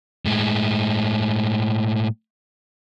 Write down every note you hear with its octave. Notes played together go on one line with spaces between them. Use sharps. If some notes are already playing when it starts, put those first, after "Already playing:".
A2 G#3